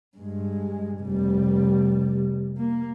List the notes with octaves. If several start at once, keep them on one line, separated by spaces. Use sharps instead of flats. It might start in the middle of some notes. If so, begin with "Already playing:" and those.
G2 G#3
F1 G3
A#3